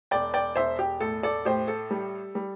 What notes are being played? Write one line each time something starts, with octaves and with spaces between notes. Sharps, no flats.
E1 D5 G5
D5 G5
E1 C5 E5
G4
A2 A4
A4 D5
A2 G4 C5
A4
G3
G3